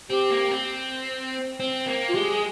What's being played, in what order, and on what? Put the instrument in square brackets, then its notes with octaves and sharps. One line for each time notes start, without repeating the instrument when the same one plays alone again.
[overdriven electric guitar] C4 [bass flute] G4
[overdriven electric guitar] A#3
C4
C4
A#3
[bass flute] F4
[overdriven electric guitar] G#3 [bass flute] G4
[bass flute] G#4